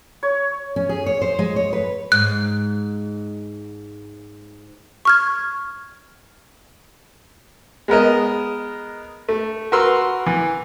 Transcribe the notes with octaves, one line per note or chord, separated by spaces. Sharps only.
C#5
C#4
G#4
C#5
C5
G#3
C#5
B4
G#2 F#6
C#6 F6 G#6
G#3 B3 A#4 D#5
A3
F#4 A#4 B4 C6 E6
E3